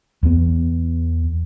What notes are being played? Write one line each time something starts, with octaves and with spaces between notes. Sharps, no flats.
E2 B3